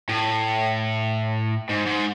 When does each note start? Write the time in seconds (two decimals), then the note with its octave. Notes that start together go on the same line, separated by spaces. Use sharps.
0.09 A2
1.69 G#2
1.87 G#2